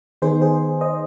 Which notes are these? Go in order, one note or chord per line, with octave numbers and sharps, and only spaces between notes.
D#3 B3 D#4 G#4 C5
G#4 C5
C5 D#5